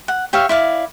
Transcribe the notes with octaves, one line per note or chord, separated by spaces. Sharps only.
F#5
G4 C#5 E5 F5
E4 D5 F5